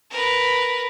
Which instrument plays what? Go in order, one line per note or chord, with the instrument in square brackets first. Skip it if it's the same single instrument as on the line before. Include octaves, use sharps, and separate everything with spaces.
[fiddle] A#4 B4